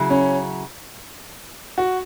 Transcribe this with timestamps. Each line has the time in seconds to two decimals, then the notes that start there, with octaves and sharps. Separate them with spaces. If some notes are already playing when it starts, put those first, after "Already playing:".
Already playing: C#3 F#3 E4
0.10 C#4
1.78 F#4